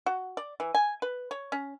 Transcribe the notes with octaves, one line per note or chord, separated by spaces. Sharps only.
F#4
D5
E3
G#5
B4
C#5
C#4